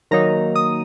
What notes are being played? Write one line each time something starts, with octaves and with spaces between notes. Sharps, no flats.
D#3 F#3 A#3 D#4 A#5
D#6